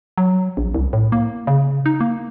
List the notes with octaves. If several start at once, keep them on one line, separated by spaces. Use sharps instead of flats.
F#3
A#1
C2
A2
A#3
C#3
D#4
A#3